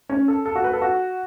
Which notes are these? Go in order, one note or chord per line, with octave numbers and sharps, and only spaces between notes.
C#4
A4
A4
F#4
B4
A4
F#4